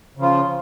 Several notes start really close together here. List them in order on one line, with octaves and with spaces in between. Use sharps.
C#3 F3 F4